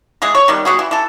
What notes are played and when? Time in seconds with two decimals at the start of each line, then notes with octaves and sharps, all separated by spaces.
0.22 E3 G#3 G#4
0.35 C#5
0.48 D#3 G3 B3
0.65 G3 B3 F#4 G#4
0.79 E3
0.91 E3 A4